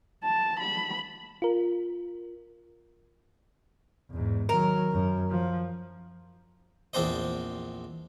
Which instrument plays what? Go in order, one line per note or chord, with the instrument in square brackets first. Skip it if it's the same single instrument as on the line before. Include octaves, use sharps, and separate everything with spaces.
[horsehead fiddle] A5
B5
[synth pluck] F4 A#4
[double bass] E2 G#2
[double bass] D#3 F#3 [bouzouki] A#4
[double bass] F#2
F3
[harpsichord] A#1 E2 C4 D4 C5 D#5